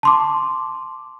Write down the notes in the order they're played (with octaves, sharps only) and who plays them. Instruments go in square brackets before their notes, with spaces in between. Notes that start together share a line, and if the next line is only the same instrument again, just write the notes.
[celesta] A5 C6 D6